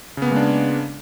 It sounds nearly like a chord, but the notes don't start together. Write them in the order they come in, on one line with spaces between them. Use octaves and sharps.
C#3 B3 A#3 G#3 D4